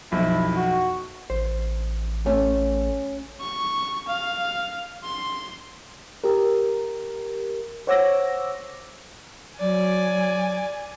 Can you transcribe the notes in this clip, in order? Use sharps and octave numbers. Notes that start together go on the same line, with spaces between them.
B1 F2 E4
F#4
A1 C5
A3 C#4
C#6
F5
C6
G4 A#4
C5 C#5 F#5 D6 E6 A#6
F#3 D5 G#5